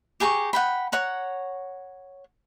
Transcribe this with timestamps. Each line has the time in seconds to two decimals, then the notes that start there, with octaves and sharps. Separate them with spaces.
0.20 G4 G#4 A#5 C#6
0.53 F#5 G5 B5
0.92 C#5 F#5 A#5